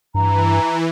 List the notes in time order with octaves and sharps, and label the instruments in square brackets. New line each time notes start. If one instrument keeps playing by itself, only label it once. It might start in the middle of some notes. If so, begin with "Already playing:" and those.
[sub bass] G2 [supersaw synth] E3 [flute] A#5